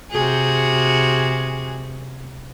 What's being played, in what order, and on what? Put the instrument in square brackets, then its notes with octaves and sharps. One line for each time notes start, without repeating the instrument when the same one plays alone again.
[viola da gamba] C3 F#4 G#4